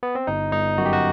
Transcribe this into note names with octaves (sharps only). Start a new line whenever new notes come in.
B3
C4
G1 D#4
G1 D#4
F#2 F#4
G4
F#4